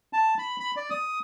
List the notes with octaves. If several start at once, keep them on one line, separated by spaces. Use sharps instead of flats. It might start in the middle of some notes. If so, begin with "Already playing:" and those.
A5
B5
B5
D5
D#6